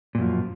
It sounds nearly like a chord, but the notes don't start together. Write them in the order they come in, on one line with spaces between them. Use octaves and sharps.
A#2 F#2 F3